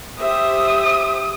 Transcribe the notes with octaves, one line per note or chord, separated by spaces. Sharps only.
G4 C5 E5 D#6